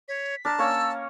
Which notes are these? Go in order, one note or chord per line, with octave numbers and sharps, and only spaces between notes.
C#5 B6
D4 A#4 A5
A#3 C#4 C#5 E6